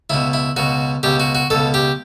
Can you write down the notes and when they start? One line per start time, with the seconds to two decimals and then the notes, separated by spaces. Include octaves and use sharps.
0.10 C#2 B2 E4
0.33 E4
0.57 C#2 B2 F#4
1.03 C#2 B2 G4
1.20 F#4
1.35 F#4
1.50 C#2 B2 A4
1.74 G4